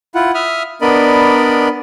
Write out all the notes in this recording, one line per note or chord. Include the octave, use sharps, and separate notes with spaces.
E4 F4 F#5
E5 D#6 F6
B3 D4 A#4 D5 D#5 B5